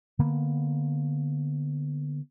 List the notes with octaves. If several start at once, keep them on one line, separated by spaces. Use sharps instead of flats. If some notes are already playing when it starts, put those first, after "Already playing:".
D3 A#3 B3